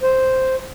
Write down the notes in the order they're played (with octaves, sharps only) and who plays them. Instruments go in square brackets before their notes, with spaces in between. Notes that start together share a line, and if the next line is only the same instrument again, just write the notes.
[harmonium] C5